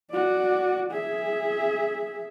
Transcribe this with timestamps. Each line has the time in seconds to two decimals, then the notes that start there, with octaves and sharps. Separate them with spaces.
0.11 F#4 D5
0.91 G#4 E5